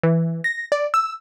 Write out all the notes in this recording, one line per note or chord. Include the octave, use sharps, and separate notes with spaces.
E3
A#6
D5
E6